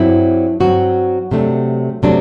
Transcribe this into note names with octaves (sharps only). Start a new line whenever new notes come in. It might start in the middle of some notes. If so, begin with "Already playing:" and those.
Already playing: G2 F#3 C4 E4
G2 F#3 C4 F#4
C3 F#3 A3 D4
C3 F#3 A3 D4